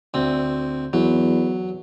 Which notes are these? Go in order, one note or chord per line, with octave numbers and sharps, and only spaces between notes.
D2 C4
E2 F#3